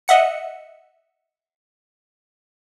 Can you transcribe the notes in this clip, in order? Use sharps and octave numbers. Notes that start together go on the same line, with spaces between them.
D#5 E5 F#5 C#7